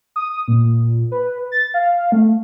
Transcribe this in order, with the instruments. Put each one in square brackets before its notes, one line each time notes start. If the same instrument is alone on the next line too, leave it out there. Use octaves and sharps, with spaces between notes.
[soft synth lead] D#6
A#2
B4
A6
F5
A3